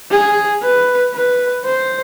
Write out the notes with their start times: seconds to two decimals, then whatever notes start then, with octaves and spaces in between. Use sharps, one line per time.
0.11 G#4
0.62 B4
1.14 B4
1.65 C5